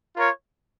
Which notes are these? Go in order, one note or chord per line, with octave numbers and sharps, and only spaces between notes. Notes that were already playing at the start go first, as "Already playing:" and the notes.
F4 A#4 C#5